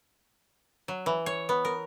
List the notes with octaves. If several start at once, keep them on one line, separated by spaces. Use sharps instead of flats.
F#3
E3
C#5
B3
A#4